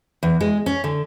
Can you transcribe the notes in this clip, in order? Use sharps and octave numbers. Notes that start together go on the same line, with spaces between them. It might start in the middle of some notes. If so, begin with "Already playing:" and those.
E2
G#3
C#4
D3